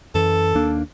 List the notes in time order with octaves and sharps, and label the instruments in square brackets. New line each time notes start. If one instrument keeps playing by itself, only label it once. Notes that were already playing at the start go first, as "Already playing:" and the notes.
[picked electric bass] F#2 E3 [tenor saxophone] A4
[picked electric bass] D#2 A#3 D4